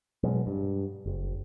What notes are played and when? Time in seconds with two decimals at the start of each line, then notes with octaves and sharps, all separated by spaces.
0.23 B2 F#3 G#3
0.47 G2
1.06 F#1